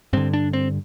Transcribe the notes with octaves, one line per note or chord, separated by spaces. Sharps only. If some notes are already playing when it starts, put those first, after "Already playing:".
G2 D3 C4
D4
C4